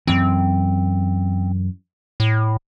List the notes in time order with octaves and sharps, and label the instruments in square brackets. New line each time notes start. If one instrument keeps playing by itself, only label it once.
[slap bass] F#2 E3 [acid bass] C4
[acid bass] A2